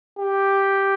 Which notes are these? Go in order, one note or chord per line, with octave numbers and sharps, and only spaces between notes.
G4